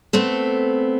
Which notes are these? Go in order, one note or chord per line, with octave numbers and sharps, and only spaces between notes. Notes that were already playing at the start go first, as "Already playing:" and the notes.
A3 B3 C4 A4